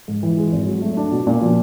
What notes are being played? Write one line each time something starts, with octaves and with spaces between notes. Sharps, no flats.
G#2
E3
G#3
G#1
F#3
A3
D4
B2
A#2
F3